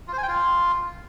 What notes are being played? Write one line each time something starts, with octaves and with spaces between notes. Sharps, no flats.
F4
C5
G#5
G5
F4